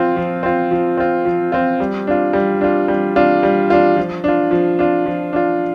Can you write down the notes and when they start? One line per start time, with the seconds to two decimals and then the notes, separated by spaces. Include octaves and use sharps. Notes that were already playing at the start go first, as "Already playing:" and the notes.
Already playing: F3 C4 F4
0.16 F3
0.43 C4 F4
0.71 F3
0.97 C4 F4
1.25 F3
1.52 C4 F4
1.80 G3
2.07 D4 F4
2.33 G3
2.61 D4 F4
2.88 G3
3.16 D4 F4
3.43 G3
3.70 D4 F4
3.96 F3
4.24 D4 F4
4.51 F3
4.79 D4 F4
5.06 F3
5.33 D4 F4